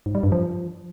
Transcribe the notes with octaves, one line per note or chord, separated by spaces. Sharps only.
G#2
G3
G2
F3